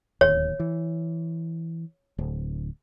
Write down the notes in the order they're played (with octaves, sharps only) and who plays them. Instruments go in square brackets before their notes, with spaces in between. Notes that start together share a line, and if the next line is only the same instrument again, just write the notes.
[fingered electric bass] D1 D#2 [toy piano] C#5
[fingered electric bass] E3
D1